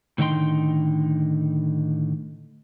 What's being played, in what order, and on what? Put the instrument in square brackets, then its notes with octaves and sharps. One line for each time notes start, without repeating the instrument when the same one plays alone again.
[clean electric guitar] A2 D3 D#3 D#4 G5 C6